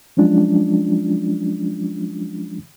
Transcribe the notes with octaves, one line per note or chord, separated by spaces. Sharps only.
F3 F#3 G#3 C#4 D4 F4